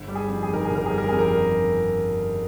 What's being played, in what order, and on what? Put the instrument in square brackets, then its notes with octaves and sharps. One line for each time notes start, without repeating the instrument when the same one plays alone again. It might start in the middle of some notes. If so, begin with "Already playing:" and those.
Already playing: [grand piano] G1
G3
G#4
F2
G#4
D#3 A#4
G#4
G1 A#4
G3 G#4
A#4
F2 G#4
A#4